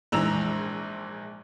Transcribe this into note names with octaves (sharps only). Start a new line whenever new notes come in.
A#1 G#2 E3 A#5 E6 F7